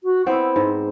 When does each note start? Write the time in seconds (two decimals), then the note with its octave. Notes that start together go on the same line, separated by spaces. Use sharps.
0.04 F#4
0.26 B3 C4 E4
0.56 G#2